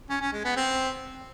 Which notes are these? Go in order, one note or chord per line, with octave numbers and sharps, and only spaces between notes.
C#4
C#4
G#3
B3
C4